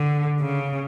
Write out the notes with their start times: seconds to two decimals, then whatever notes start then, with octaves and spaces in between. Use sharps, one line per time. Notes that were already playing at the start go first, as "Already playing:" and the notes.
Already playing: D3
0.41 C#3